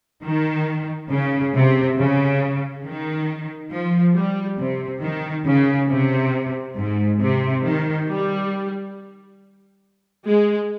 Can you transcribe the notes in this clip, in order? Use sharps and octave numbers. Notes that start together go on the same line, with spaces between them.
D#3
C#3
C3
C#3
D#3
F3
G3
C3
D#3
C#3
C3
G#2
C3
D#3
G3
G#3